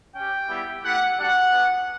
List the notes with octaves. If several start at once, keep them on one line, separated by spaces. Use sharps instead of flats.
C#4 G4 G5
G3 B3 E4 G4
A3 E4 G4 F#5
G3 D4 F#4 F#5
B3 D4 F#4